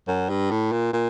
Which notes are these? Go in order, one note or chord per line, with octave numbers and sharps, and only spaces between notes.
F#2
G2
A2
A#2
A#2